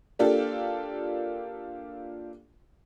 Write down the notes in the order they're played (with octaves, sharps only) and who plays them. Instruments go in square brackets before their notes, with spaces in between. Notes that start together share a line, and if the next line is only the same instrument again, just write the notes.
[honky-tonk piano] A#3 D4 F4 G4 A4